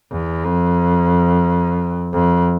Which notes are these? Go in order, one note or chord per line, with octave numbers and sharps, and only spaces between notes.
E2
F2
F2